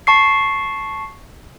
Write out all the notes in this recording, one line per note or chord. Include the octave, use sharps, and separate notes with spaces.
A5 C#6 C7